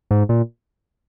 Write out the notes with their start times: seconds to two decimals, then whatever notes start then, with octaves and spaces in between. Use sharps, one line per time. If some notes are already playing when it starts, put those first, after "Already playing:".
0.11 G#2
0.29 A#2